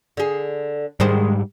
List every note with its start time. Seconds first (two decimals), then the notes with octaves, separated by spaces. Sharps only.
0.17 D3 G#4
1.00 G#2 D#3 G3 G#3 C5